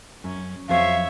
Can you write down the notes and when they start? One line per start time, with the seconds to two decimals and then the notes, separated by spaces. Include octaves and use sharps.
0.24 F#2 C#4
0.69 F2 F#3 C5 C#5 E5 F5